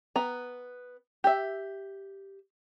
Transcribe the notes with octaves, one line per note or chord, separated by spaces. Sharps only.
B3 A#5
G4 E5